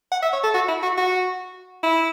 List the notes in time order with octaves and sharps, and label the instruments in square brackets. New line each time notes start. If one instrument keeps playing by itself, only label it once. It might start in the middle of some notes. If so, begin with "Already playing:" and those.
[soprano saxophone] F#5
E5
C#5
A4
F#4
E4
F#4
F#4
E4